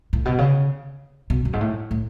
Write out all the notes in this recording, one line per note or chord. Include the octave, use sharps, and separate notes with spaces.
A2
B2
C#3
B2
F#2
G#2
A2
A2